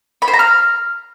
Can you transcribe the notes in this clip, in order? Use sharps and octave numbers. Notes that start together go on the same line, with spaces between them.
B5
C5
A#5
F6